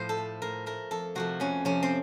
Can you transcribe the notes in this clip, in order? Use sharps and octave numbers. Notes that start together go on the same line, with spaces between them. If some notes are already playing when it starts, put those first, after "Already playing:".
Already playing: A2 F3 C5
A4
A3
A2 A#4
A3 A#4
F2 A4
C3 F3 A3 F#4
F2 C#4
C3 F3 A3 C#4
C4